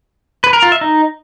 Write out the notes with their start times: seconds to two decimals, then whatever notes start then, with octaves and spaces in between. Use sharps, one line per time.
0.44 B4
0.53 A#4
0.63 F4
0.72 E5
0.81 D#4